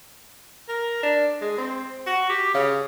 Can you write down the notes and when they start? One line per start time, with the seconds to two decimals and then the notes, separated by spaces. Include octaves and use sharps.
0.68 A#4
1.03 D4
1.41 G#3
1.58 C4
2.07 F#4
2.30 G4
2.54 C#3